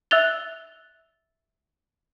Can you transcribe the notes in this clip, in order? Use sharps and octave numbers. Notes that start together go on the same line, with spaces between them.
E5 E6 F#6 A6 F7 G7